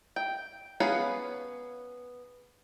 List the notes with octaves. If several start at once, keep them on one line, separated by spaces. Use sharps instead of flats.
G5
B3 C#4 G#4 B4 F5